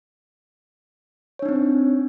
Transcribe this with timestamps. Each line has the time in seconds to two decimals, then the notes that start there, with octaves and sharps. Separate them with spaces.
1.39 C#5
1.42 D4
1.45 D#4
1.49 C4